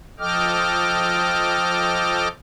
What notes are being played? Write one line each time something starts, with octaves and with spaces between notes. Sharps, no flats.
F3 A4 D#5 G5 D6 F6